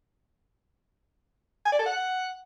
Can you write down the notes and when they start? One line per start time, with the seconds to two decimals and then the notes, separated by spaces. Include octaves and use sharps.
1.65 G#5
1.72 D5
1.79 A4
1.86 F#5